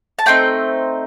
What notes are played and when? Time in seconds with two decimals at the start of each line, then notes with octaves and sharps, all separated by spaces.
0.19 A5
0.26 A3 C4 D#4 G5